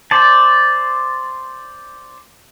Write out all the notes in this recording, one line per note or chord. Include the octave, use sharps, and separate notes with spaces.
C5 D5 A5